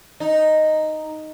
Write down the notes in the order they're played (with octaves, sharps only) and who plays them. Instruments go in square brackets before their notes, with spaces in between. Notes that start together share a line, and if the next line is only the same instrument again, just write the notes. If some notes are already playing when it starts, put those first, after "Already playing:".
[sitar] D#4